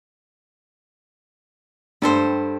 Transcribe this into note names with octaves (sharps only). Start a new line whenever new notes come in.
G2 G3 A4 C5